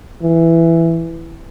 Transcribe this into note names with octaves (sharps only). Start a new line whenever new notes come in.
E3